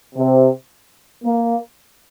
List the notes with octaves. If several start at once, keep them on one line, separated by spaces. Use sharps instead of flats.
C3
A#3